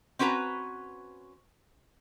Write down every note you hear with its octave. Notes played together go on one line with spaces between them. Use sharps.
C4 C#4 F#4 B4 A#5